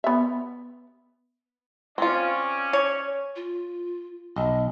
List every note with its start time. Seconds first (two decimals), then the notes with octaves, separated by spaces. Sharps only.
0.04 B3 E5
1.98 C4 C#4 F4 D5
2.73 C#5
3.36 F4
4.36 B1 D#5